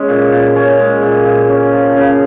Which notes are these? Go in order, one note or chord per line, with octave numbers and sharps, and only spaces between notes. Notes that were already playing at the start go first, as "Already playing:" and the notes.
Already playing: G#3 C#4
A#2
A#2
C#4
G#3
A#2
A#2
C#4
F3
C#3